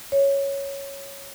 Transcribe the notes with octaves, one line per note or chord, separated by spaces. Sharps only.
C#5